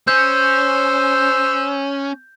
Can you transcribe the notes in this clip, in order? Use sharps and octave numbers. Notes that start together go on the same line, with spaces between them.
C#4 C5 E6 G6